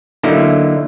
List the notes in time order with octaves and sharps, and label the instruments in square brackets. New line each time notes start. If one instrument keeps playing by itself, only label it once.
[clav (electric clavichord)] D3 F#3 A#3 D#4 E4